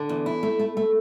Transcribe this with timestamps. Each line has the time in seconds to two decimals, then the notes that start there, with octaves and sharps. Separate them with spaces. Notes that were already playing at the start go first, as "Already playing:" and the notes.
Already playing: D3
0.09 E2
0.26 E4
0.43 A3
0.59 A3
0.77 A3